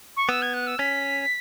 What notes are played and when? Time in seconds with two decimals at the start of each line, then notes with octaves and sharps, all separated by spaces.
0.16 C#6
0.29 B3 E6
0.42 G#6
0.53 F#6
0.67 E6
0.79 C#4 B6